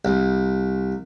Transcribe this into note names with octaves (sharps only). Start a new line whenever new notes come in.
C2